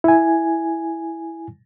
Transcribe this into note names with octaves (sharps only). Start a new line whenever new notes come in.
E4 G#5